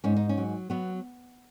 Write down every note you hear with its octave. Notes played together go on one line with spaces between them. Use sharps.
G#2 C#4
D#4
C#4
F#3
F#3 B3